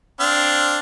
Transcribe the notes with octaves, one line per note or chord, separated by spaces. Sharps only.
C4 D4 F5